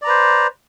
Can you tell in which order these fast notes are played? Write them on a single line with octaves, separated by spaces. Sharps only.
D5 A#5 B4 C5